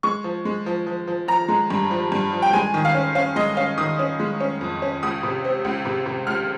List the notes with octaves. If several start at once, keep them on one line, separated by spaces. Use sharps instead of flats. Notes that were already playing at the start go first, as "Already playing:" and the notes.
G#3 C#6
F3
G#3
F3
F3
F3
F3 A#5
G#3
G2
F3
G2
F3
G5
G#3 G#5
D#3
F5
C#4
C#4 F5
G#3 D#5
C#4 F5
D#3 D#6
C#4
G#3
C#4
F2
C#4
C#2 D#6
C3
C4
C#2
C3
C3
C#2 F6